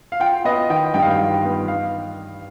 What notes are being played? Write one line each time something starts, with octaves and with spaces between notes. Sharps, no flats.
F5
F4 G5
B3 D#5
D#3 G5
G2 G5
F5
G5
F4
B3
F5